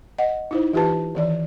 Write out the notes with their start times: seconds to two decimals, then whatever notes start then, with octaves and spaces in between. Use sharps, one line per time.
0.18 D#5 F#5
0.51 D#4 E4 C5
0.73 E3 F4 G4 B4 A5
1.15 D#3 E3 D5